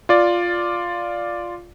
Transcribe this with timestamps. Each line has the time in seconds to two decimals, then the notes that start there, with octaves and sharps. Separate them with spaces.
0.09 F4 D5